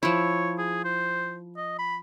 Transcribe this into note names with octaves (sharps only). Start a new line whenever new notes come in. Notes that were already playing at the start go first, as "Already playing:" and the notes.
F3 E4 C#5
G#4
C5
D#5
B5